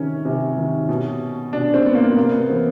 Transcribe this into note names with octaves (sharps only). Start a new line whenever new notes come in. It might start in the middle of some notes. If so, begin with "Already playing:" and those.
Already playing: C3 D#3 C#4
C3
D#3
B2
B2 D4
C4
B3
A#3
C3 A#3
B3
E3 C4